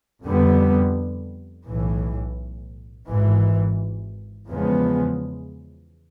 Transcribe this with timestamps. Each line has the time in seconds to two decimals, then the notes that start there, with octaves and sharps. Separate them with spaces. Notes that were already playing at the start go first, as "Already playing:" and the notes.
0.24 F2 D3 G3 B3
1.66 B1 A2 E3
3.08 G#1 G#2 E3
4.51 E2 C#3 F3 G#3 B3